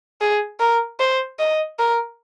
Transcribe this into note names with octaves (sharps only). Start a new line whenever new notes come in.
G#4
A#4
C5
D#5
A#4